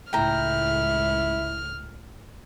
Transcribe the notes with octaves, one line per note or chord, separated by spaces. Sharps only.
C#2 A2 E4 G5 A#5 F6